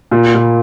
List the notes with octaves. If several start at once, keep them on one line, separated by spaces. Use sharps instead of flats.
A#2
A#2